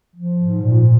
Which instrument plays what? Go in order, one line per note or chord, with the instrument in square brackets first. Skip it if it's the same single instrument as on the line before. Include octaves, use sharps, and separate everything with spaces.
[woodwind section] F3
G#2
A#2